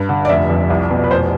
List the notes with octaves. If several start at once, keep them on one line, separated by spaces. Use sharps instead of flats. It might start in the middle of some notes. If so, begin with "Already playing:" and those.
Already playing: G2
D3
D5
F1 E5
F2
C2
B2
B4
F1 C5